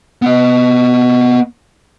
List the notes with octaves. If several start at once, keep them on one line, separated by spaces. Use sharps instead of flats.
B3 D#5